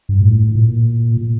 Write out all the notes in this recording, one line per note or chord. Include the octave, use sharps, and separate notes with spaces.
G2
A#2
A2
A#2
A#2